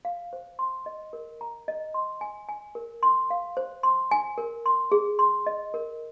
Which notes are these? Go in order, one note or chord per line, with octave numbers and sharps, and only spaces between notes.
F5
C5
C6
D#5
A#4
A#5
D#5
C6
G#5
G#5
A#4
C6
F5
C5
C6
G#5
A#4
C6
G#4
C6
D#5
A#4